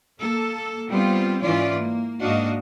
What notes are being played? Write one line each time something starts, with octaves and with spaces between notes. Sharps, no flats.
A#3 A4
G3 B3 C4 F4
G#2 E3 C#4 F4 D5
A#3
G#2 A#3 D4 F#4 D#5 F5